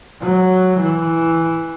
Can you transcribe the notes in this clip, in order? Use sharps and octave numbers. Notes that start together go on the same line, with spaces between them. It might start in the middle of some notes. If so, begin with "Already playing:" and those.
F#3
E3